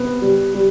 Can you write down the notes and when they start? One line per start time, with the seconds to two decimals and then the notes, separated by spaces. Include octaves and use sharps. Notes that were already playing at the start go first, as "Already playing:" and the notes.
Already playing: C3 B3
0.22 G3
0.55 G3